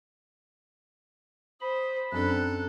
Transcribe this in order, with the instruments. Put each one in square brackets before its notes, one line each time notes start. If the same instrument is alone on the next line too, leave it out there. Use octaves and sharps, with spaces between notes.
[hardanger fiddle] C5 [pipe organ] B5 [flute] D#6
[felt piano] F#2 C4 D4 [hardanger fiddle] A4 [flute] F#6